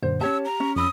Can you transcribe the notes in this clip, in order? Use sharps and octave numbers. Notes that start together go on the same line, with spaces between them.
F#2 A#2 D3 C5
C#4 G4 C#5 A5 E6
A#5
C#4
F2 B5 D#6 E6